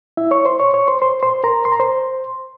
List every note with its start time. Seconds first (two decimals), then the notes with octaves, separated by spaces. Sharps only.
0.17 E4 E5
0.31 C#5 C#6
0.45 C5 C6
0.60 C#5 C#6
0.74 C#5 C#6
0.88 C5 C6
1.02 C5 C6
1.23 C5 C6
1.44 A#4 A#5
1.65 C6
1.72 A#5
1.80 C5 C6